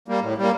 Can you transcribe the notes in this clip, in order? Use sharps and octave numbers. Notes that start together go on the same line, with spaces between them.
G3 A#3
A2
G3 A#3